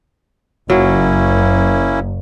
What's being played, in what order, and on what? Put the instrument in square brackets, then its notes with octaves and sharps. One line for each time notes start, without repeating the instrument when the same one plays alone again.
[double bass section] F#1 [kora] F#3 [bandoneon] A#3 C#4 E4